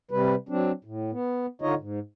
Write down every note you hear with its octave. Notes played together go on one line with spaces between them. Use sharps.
C3 G3 B4
F#3 C4 D4
A2
B3
D3 D#4 F4 C#5 D#5
G#2